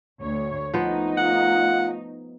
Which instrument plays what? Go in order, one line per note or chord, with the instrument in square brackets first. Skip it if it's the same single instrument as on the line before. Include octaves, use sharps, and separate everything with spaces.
[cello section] D2 C#5
[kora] F3 B3 [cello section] A3 D#4
[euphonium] F4 [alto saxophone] F#5